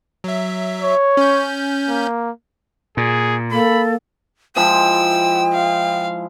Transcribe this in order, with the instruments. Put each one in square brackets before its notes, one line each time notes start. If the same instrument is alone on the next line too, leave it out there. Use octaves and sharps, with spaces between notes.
[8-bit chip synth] F#3 E5
[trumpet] C#5
[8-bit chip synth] C#4 G6
[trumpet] A#3
[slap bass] A#2 [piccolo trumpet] G#4
[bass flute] A#3 [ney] A4 [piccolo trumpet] B5
[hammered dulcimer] F3 G#3 E4 [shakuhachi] G5 [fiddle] E6
[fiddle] F5